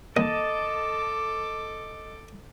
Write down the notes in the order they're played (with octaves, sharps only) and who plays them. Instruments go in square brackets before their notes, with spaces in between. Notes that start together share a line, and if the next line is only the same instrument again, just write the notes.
[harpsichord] D#2 [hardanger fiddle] A4 D6 [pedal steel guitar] D#5 A5